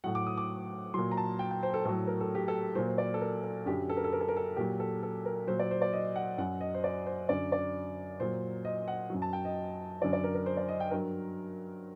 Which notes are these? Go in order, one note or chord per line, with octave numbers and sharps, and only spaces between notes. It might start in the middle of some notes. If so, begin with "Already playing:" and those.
A2 F#3 F#5
D6
D#6
D6
A#2 F#3 C6
A#5
A5
G5
G5
C5
A4
A2 F#3 A4
A#4
A4
G4
A4
A#2 F#3 C5
C5
D5
A4
A#4
A4
F#2 D3 F#3 G4
A4
A#4
A4
A#4
A4
A#4
A4
A#2 F#3 G4
A4
A4
A#4
A#2 F#3 C5
D5
C5
D5
D#5
F#5
F#2 F#3 F#5
D#5
C5
D5
C5
F#2 D3 F#3 D5
D5
A#2 F#3 C5
D#5
F#5
F#2 F#3
A5
G5
D#5
F#2 D3 F#3 D5
D5
A#4
A#4
C5
D5
D#5
G5
G2 F#3 A#4